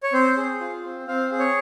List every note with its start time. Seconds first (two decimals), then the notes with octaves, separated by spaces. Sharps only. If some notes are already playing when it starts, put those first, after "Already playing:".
0.03 C#5
0.13 C4 C5
0.37 G#4
0.60 F4
0.84 C4
1.08 C4 F5
1.31 G#4
1.39 C#5